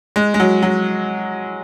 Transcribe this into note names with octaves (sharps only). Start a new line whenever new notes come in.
G#3
G#3
F#3
F#3